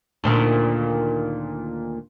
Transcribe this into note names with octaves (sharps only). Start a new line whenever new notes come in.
D2 A#2 D#3